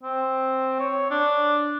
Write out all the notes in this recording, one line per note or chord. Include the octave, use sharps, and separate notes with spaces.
C4
C#5
D4